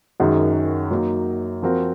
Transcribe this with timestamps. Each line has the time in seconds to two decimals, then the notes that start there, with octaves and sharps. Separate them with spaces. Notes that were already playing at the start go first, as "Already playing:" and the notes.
0.20 F#2 D#3 G#3 D#4 F#4
0.91 F#3 A#3 D#4 A#4
1.62 F3 C4 F#4 A#4